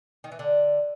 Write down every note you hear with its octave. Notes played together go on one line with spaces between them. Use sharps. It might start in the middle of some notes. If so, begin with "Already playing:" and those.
D#3
E3
D3